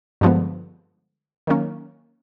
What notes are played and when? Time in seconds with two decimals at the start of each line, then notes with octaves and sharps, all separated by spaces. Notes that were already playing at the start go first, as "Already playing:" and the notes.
0.21 G2 D3 F3 G#3 B3
1.47 D#3 F#3 A#3 C#4